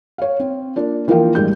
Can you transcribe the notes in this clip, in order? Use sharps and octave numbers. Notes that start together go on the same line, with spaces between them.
C#5 F5
C4
A#3 D4 F4
E3 F3 A#3 A#4 F5 G5
A1 G3 G#3 D#4 G4 G6